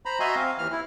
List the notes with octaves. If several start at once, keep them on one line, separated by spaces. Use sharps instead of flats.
C5 A#5 B5
F#4 D#5 E5 G#5 A#5 C6
C4 F5
D#2 E3 F6
E4